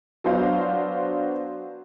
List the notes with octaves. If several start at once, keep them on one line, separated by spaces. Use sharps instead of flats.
F#3 B3 D4 C5 F5